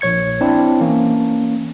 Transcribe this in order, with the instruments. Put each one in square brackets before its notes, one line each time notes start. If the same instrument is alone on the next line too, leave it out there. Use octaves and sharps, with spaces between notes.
[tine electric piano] A#1 C#5 G#6 C#7
C4 D4 E4 A5
E3 A#3 C#4